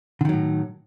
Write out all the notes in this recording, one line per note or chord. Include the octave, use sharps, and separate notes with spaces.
A2 D3 D#3 F#3